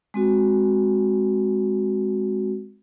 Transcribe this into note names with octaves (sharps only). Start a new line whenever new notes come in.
G#3 C4 F#4